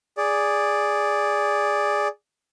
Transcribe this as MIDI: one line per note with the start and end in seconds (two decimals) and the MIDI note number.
0.18 2.08 68
0.18 2.08 74